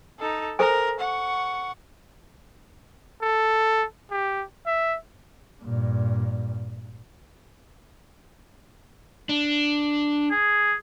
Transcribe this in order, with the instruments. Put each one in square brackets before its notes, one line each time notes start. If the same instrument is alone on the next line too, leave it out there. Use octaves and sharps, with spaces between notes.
[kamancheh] D#4 A4
[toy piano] A4 C5 G#5 [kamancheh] A#4
[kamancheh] F#5 C#6
[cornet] A4
G4
E5
[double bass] G2 A#2
[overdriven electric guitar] D4
[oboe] G#4